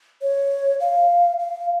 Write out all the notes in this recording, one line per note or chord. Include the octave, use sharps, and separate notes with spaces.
C#5
F5
F5